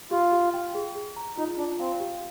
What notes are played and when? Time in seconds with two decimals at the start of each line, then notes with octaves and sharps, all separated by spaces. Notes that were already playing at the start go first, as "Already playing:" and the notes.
0.11 F4 G4
0.32 G4
0.54 G5
0.75 G#4
0.95 G#4
1.17 A#5
1.37 D#4 F4
1.58 D4 F4
1.79 C4 F5
2.00 G4